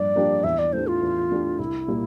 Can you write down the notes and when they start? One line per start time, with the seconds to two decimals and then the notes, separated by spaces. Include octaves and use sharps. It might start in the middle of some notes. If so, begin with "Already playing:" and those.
Already playing: G2 F3 A#3 D4 D5
0.16 F3 A#3 D4 G4
0.44 E2 E5
0.59 D5
0.73 E3 A3 D4 G4 C5
0.87 F4
1.02 E2
1.31 E3 A3 D4 G4
1.59 C2 E4
1.88 A#2 G3 A#3